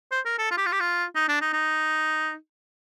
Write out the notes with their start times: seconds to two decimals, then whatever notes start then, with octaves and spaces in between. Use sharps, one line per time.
0.11 C5
0.25 A#4
0.38 A4
0.51 F4
0.57 G4
0.65 F4
0.72 G4
0.80 F4
1.15 D#4
1.28 D4
1.41 D#4
1.53 D#4